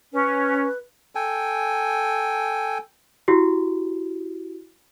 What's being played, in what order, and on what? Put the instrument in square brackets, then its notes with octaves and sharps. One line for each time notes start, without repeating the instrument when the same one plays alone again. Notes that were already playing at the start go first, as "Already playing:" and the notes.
[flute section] C#4 [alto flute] B4
[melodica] A4 G5 G#5
[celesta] E4 F#4 G4